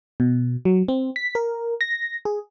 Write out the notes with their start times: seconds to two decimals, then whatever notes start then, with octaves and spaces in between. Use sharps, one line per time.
0.20 B2
0.65 F#3
0.88 C4
1.16 B6
1.35 A#4
1.81 A#6
2.25 G#4